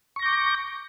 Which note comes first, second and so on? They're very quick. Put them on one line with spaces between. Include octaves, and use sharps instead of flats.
C#6 A#6 G6 D6